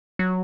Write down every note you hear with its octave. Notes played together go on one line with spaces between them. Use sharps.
F#3